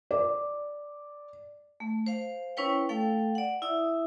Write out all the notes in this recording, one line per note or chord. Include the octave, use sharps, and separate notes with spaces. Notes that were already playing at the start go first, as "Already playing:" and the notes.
D5
A3
C5 F5
C#4 E4 B4 C#5 G5
A3 A4 F5 G5
D5 F#5
E4 E5 D#6